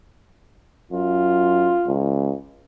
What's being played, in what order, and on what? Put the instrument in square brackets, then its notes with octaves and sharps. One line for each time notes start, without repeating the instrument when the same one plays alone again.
[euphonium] F#2 [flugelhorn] F4
[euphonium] C#2